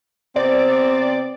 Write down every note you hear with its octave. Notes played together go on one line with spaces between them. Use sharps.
C3 B3 C4 D5